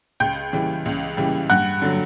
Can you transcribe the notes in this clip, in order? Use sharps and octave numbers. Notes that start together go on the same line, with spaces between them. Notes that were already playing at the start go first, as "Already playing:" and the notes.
C#2 G5 G6
C#3 E3 G3
C#2
C#3 E3 G3
G2 F#5 F#6
D3 F#3